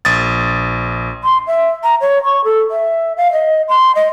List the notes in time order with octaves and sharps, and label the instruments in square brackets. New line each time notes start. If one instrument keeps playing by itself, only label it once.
[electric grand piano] A#1 D#6 A6
[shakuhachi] C6
E5
A#5
C#5
C#6
A4
E5
F5
D#5
C6
D#5